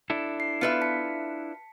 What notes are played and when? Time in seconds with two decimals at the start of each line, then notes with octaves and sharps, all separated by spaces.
0.10 D4 E4 A4
0.40 C7
0.61 B3 F4 B4 E5 C#7
0.82 A5 B6 C#7